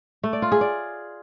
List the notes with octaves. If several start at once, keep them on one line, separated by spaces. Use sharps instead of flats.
A3
D5
F4
G#4
D5